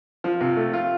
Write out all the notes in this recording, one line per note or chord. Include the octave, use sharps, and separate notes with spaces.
F3
C3
A3
F4